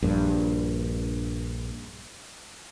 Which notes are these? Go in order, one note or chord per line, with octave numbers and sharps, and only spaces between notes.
A#1 G2